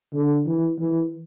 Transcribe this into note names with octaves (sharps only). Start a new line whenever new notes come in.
D3
E3
E3